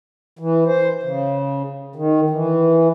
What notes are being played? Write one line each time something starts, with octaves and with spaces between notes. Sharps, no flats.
E3
C5
C#3
D#3
E3